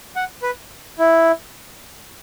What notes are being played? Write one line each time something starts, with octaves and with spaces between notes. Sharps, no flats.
F#5
B4
E4